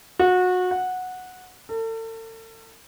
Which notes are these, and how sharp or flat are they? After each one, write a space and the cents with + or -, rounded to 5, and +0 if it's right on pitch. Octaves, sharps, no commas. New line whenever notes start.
F#4 -25
F#5 -10
A4 +40